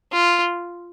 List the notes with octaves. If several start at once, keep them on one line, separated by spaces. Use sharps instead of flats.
F4